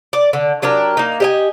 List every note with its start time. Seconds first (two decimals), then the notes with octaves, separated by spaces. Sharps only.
0.13 D5
0.33 D3
0.62 F#3 D4 G4 A#4
0.97 A#3 D#4
1.20 G4 D#5 G#5